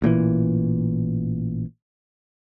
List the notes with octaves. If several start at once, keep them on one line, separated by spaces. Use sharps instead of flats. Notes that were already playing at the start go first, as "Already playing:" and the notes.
A1 A#2 C#3 E3